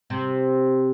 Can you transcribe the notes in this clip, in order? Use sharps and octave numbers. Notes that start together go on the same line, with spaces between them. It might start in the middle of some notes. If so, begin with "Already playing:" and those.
C3